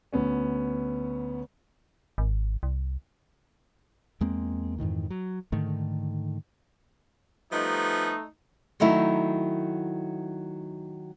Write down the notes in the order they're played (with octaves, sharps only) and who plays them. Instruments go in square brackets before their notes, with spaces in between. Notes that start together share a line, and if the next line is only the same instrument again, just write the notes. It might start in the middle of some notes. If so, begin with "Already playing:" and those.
[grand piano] D2 B3 C#4
[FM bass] G#1
C2
[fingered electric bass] E2 G#3 A#3 C4
F2 G#2 D#3 E3
F#3
G#2 D3 D#3 A3
[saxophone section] F3 G3 B3 [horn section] A3 D#4
[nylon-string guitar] D#3 F#3 A3 D#4 E4